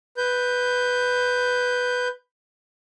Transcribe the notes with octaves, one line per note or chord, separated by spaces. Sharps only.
B4 G6